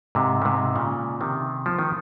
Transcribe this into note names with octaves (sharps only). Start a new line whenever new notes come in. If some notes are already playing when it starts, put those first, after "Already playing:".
G#2 C3
C#3
G#2 C3
A#2 C#3
C3 D#3
F3
D#3